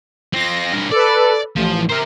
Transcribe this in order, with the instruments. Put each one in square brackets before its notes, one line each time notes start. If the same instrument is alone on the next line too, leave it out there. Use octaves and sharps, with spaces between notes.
[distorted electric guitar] C4 F4 [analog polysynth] A#6
[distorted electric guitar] G2 A#4
[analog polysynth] A4 B4 [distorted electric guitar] D5
[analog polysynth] A1 [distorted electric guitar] F3
[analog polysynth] A#4 [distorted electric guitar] C5 E5